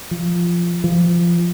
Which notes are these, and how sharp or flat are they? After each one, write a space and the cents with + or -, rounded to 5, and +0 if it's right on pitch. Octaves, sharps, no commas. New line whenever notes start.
F3 -10
F3 -20